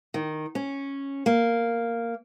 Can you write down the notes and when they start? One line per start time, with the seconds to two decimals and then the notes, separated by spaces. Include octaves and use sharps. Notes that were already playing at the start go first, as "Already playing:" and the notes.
0.14 D#3
0.55 C#4
1.26 A#3